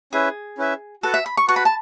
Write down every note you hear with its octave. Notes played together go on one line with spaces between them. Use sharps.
C#4 E4 G#4 B4 E5
C#4 E4 B4 E5
F#4 A4 B4 F#5 A5
E5
B5
C#6
F#4 B4 F#5 A5 C#6
B5
A5